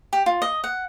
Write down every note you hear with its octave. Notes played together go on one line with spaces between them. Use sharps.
G4
F4
D#5
F#5